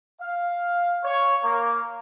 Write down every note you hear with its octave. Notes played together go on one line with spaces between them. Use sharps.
F5
C#5
A#3